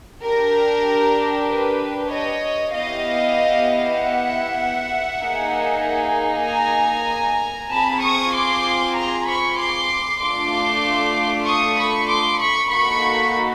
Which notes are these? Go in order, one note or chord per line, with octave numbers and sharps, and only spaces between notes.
D4 G4 A#4
B4
C#5 D#5
B3 E4 G4 D#5 F5
E5 F#5
A#3 D#4 G#4
G#5 A#5
C4 F4 G#4 A5 B5
C#6 D#6
C6 D6
A#5 C6
B5 C#6
C6 D6
A3 D4 F4 C6 D6
C#6 D#6
B5 C#6
C6 D6
B5 C#6
A#3 D#4 F#4 A4 B5 C#6